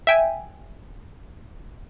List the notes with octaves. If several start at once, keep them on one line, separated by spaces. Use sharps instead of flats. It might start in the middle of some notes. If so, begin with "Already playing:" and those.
E5 G5 G#5